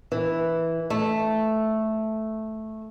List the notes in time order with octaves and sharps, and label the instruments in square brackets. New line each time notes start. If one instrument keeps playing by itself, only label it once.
[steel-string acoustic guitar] E3
A3